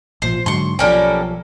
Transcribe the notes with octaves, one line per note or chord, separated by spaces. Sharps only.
A1 A#2 F3 C5
G#2 D3 F#3 C6 C#6
B1 F3 G3 A#3 C#4 A4 A#4 G5